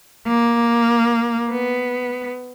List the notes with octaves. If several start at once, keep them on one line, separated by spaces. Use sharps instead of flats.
A#3
B3